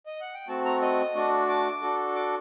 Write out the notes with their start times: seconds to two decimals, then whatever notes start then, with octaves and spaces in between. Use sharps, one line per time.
0.06 D#5
0.21 F#5
0.34 G5
0.48 A3 C4 F#4 A5
0.65 A#5
0.82 D#5
1.15 A3 D4 F#4
1.48 D6
1.82 D4 F#4 A4
2.15 D6